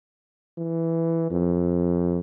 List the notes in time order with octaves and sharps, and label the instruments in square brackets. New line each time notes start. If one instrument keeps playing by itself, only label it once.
[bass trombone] E3
F2